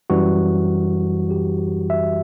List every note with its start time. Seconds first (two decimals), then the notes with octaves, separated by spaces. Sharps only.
0.10 F#2 E3 G3 F#4
1.31 G4
1.90 E5